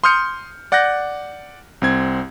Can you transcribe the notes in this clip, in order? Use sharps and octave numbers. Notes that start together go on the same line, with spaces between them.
C6 D#6 F6 G6 C#7
D5 F#5 F#6 G6 A#6
C2 C4 G#6